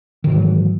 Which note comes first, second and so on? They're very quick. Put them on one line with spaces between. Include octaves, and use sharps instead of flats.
D#3 G#2 E3 F#3